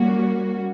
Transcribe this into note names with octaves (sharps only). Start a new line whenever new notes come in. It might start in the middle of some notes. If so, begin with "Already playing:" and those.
Already playing: G3 A#3 C#4 F#4